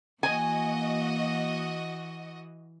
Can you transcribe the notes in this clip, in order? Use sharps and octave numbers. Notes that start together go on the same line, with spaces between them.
E3 A#3 F#4 D#5 G#5